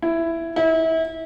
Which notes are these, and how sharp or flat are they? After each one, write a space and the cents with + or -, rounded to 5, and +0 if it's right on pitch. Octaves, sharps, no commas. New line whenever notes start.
E4 +10
E4 -30